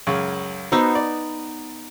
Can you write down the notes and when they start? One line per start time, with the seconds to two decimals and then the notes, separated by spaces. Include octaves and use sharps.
0.07 C#2 F#2 C#3
0.72 B3 D#4 F#4 C5 E6
0.95 D5